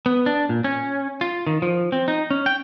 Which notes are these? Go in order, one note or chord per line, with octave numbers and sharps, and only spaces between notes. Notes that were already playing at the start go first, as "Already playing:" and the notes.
B3
D4
A#2
C#4
F4
D#3
F3
C4
D#4
C#4
G5